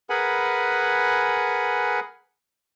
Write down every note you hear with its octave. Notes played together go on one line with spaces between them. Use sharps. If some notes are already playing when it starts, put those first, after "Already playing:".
G#4 A#4 B4 F#5 G#5 B5